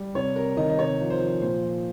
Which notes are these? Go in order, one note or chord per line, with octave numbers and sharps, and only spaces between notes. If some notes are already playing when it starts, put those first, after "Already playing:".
Already playing: G3
C3 C#5
C3 A#4
D#3 D#5
D#5
C3 C#5
F3
C5
F3
A#2 C5
F3